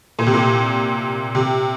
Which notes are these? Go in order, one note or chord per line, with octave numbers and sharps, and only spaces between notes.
A#2
C3
A#2
C3